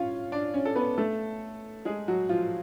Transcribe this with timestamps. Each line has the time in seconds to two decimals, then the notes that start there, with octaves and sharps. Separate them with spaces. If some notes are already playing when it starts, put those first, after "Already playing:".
Already playing: C#4 F4 C#5 F5
0.32 D4 D5
0.54 C#4 C#5
0.65 A4
0.75 B3 B4
0.98 A3 A4
1.85 G#3 G#4
2.08 F#3 F#4
2.29 F3 F4